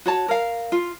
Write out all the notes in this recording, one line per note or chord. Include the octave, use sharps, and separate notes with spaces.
F#4 C#5 A5
A#4 F5
F4